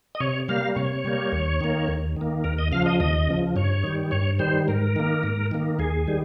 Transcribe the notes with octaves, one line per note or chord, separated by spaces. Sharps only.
D#5
C3 C#5
G3 A#3 F5
C3 C#5
G3 A#3
D#2
D#3 A#3
D#2
D#3 A#3
D#2 A#4
D#5
C#3 F3 F5
D#5
D#2 D#5
C#3 F3
G2 C#5
D#3 G3
G2 C#5
D#3 G3 C5
G#2 A#4
D#3 A#3
G#2
D#3 A#3
D#2 G#4
D#3 G3